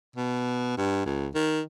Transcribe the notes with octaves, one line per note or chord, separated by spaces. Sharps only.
B2
G2
C#2
D#3